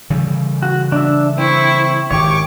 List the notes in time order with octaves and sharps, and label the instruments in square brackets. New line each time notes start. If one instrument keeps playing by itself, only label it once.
[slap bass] C#3 E3 G3
[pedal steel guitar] F#4
D4 E5
[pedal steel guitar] C4 [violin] E4 C#6
[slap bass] G#1 D#3 [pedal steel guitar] G4 C#5 [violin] C#6 D6